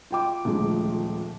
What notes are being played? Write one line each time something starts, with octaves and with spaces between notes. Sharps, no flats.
F4 G5 D6
D#1 D2 F3 G#3